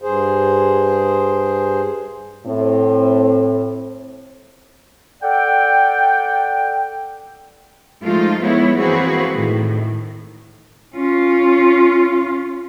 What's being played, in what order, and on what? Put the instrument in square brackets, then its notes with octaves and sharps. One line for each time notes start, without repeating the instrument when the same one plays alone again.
[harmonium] G2 G#4 C5
[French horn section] A2 C4
[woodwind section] A4 D5 F#5 G5
[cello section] F3 G#3 A3 D#4 F4
G#3 B3 E4 C#5
E3 A#3 C4 F#4 G#4 B4
A2 D#3
[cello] C#4 F4